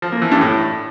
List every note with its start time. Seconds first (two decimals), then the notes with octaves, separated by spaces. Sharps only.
0.02 F3
0.12 A#3
0.22 E3
0.31 G2
0.41 A2